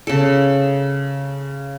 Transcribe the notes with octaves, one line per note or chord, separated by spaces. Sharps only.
C#3 A4